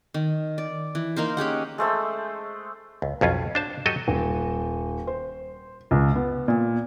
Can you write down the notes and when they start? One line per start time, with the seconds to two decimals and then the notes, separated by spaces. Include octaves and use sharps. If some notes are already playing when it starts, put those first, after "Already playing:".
0.14 D#3
0.58 D5
0.95 E3
1.16 A#3 D#4 A#4 C5
1.37 C#4 G4 G#4 F#5
1.78 G#3 A3 C5 E6
3.02 C#2
3.21 B1 F2 C#4 F4
3.55 D4 C5 A5
3.86 F#3 G4 A4 D#5 G5
4.08 D#1
5.07 C5
5.91 C#2
6.15 B3
6.48 A#2